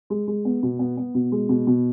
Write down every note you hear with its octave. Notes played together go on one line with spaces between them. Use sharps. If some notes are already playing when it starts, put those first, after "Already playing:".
G#3
G#3
B3
B2
B3
B3
B2
G#3
B2
B2